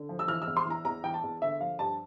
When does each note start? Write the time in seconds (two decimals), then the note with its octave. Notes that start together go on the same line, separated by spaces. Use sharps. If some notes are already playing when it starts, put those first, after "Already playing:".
Already playing: D3
0.09 F3
0.19 E6
0.27 E3 F6
0.42 E6
0.47 E2
0.57 C6
0.65 E3
0.70 A#5
0.85 E2 A#5
1.04 E3 G5
1.14 A5
1.23 E2
1.42 D3 E5
1.60 F3 F5
1.79 G2 A5